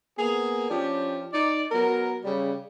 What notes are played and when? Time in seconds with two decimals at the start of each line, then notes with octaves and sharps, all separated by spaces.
0.19 A#3 B3 G#4
0.70 F3 C#4 D4 G4
1.33 D#4 D5
1.72 F#3 B3 A#4
2.25 C#3 G3